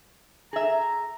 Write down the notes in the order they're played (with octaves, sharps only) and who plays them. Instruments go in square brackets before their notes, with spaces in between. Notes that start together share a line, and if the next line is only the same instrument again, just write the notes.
[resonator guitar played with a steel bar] G#4 E5 [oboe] A#5